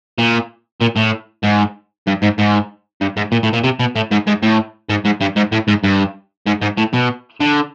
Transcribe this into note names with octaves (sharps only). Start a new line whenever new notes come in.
A#2
A#2
A2
G#2
G2
G#2
G#2
G2
G#2
A#2
A2
A#2
C3
B2
A2
G#2
G#2
A2
G#2
G#2
G2
G#2
A2
G#2
G2
G#2
G#2
A2
B2
D3